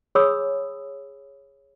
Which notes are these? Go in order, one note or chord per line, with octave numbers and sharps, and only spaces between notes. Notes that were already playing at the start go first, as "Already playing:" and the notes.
G#4 C#5 G#5 B5 D#6 E6